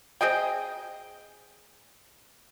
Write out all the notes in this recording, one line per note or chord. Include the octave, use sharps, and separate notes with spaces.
C4 G#4 D#5 G5